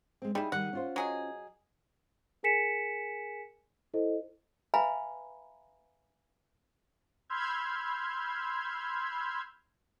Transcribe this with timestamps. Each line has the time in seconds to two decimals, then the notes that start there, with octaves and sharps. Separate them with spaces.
0.22 G#3 C4
0.35 G3 D#4 E4 G#4
0.52 D#3 G3 F#5
0.73 C#4 F4 C5
0.96 F#3 G#4 D#5
2.43 G#4 A#4 G#5 B6 C#7 E7
3.94 E4 A4 C5 D#5
4.74 B4 E5 F5 G#5 A#5 B5
7.29 B5 C6 E6 F6 G6 G#6